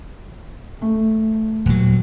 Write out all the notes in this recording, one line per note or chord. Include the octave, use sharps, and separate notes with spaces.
A3
D#1 F#3